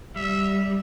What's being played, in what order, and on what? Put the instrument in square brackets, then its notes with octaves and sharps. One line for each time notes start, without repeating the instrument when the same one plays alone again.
[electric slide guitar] G3 [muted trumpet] E5